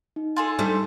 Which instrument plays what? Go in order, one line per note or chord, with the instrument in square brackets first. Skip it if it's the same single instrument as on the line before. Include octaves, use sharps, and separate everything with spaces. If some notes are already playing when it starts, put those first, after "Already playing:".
[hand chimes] D#4
[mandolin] F4 G#4 A4
[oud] G3 A3 D4